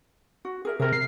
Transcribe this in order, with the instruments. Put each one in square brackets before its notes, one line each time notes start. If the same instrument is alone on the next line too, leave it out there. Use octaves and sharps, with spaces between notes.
[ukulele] F#4
G#4 A#4 E5
[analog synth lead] C3 [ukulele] G#4 A#4
[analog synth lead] C7